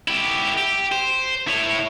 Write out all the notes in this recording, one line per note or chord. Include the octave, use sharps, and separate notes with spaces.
E4 G4
G4
C5
E4 C#5